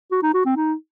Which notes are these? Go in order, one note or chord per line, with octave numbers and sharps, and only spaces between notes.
F#4
D#4
F#4
C4
D#4